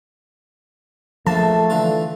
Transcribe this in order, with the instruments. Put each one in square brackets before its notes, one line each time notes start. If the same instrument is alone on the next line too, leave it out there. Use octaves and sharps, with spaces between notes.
[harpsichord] A#1 A#3 [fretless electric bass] F3 [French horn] A3 [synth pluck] A5
[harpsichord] D3 E3 F4